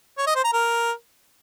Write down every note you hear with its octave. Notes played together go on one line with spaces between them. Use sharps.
C#5
D#5
C5
A#5
A#4